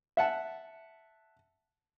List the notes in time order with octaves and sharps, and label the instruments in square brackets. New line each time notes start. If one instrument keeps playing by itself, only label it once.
[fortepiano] E5 F#5 A5